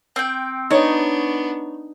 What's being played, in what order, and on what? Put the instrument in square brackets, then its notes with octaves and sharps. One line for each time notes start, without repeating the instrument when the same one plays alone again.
[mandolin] C4 G5
[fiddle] B3 D4 [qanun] D#4 [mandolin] C#5